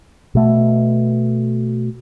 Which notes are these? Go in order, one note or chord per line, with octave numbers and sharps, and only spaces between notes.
B2 A3